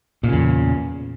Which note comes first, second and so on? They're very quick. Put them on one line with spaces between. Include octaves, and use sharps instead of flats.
A#2 C#3 E2